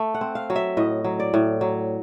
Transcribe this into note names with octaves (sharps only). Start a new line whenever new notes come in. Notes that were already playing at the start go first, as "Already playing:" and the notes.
Already playing: A3
F#5
C4
F5
F#3
E5
A2 D#5
F#3
D5
A2
F#3